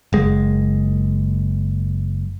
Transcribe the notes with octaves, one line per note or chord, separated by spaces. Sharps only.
F#1 G#3